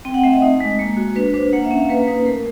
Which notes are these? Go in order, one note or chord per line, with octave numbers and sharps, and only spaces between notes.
C4 G5
F#5
A3 E5
D#5
D#4
G#3
A#3
F#4
D4 B4
D4 C5
A#3 F#5
E5
C#4
F5
A#3 B4
D#4 B4
A3 A#4